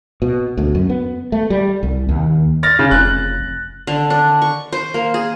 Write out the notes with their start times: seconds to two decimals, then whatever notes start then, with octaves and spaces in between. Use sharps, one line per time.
0.22 B2
0.57 D2
0.75 F#2
0.90 B3
1.32 A3
1.50 G3
1.83 C2
2.09 D#2
2.63 F6 A6 A#6
2.79 C#3
2.91 F1 F#6
3.87 D3
4.10 D4
4.42 C#6
4.72 C5
4.94 A#3
5.14 G#4